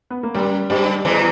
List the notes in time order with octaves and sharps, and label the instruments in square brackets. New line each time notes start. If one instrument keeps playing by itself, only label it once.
[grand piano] B3
A#3
[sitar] F#2 [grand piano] G3
[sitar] G2 [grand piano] G3
[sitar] E2 E3